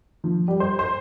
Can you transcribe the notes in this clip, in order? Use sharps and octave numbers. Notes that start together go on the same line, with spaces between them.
F3
G3
C5
C5